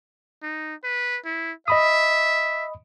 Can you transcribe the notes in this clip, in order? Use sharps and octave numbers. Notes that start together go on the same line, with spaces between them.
D#4
B4
E4
D#5 E5 B5 D#6